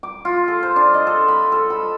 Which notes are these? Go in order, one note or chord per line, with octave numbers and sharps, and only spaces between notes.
D6
F4
A4
C5
D4
D#5
A4
B5
A4
B5